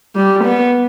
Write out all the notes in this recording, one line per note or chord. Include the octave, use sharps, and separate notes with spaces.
G3
B3